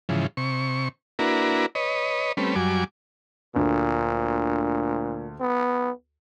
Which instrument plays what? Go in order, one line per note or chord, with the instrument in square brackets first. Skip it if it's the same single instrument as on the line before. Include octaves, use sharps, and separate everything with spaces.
[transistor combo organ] G#2 C#3 E3 F3
C3 C#6
A#3 D4 E4 F#4 A#4 B4
B4 C#5 D#5
G3 A3 C4 C#4 B4
F#2 F#3 G3 G#5 D6
[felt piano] D2 [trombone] A#2
[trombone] B3